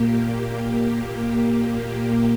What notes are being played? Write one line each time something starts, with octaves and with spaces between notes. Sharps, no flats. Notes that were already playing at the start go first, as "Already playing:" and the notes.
Already playing: A#2 A#3 G4
A#2 A#3 G4